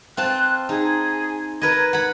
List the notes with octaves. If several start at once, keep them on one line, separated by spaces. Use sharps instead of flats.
C4 F4 A5 F#6
D#4 G#4
A#4 B4 D#5 G#6
F#5 B5 G#6